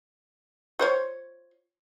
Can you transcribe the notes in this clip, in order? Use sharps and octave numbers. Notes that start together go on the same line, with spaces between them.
F4 C5 C#5